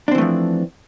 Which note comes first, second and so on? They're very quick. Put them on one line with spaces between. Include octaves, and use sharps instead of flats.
D4 C4 E3 A3 F3